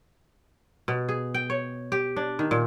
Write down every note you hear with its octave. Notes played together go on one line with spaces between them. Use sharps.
B2
G#4
G5
C#5
G4
D4
D#3
A#2